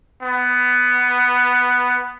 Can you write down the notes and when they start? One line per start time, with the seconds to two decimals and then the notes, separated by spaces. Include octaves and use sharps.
0.22 B3